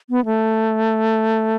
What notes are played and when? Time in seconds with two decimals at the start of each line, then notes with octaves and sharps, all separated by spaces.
0.10 B3
0.25 A3